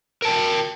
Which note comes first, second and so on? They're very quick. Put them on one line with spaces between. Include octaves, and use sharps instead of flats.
A#4 A5 G5